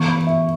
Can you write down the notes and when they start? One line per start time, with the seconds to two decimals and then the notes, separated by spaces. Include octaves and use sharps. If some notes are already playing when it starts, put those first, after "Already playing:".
Already playing: E3 B3 C#6
0.08 B5
0.27 E5